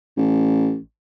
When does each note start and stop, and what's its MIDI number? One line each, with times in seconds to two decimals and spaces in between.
0.17 0.77 33